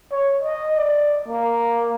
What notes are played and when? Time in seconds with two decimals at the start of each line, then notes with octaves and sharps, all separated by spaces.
0.12 C#5
0.43 D#5
0.77 D5
1.28 A#3